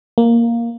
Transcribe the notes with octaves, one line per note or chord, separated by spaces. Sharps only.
A#3